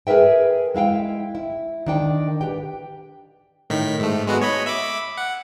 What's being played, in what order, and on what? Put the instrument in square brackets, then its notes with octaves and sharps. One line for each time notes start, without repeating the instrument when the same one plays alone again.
[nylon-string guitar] G#4 A#4 B4 E5 G5
G#3 E4 F5 G5
E4
D#3 D4 G5
G4 B4 G5
[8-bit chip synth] A2 D#3 B6
G#2 A3
G#3 B3 F#4
C#5 D#5 B5
E5 B5 D6
F#5